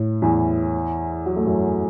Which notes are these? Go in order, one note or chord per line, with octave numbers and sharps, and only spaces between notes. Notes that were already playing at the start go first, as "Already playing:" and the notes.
Already playing: A2
E2 E3
F#3
A3
F#2 F#3